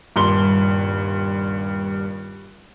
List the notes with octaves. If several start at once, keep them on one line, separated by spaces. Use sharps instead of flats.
D#1 G2 C6 G7